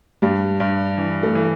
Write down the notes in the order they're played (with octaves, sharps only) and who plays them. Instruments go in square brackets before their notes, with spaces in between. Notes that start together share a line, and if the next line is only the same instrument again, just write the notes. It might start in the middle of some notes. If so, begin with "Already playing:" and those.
[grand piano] G2 [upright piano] G3
[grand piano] G2
E3
[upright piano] A3
[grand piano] E3